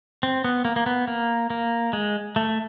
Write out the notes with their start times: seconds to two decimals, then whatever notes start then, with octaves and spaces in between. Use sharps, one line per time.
0.23 C4
0.44 B3
0.65 A#3
0.76 A#3
0.86 B3
1.08 A#3
1.50 A#3
1.93 G#3
2.36 A3